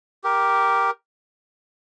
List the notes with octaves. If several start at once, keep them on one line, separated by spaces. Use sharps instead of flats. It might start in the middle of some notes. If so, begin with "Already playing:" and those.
G4 A#4